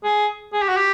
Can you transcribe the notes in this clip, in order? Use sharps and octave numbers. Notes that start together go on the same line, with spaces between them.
G#4
G#4
G4
F#4
G4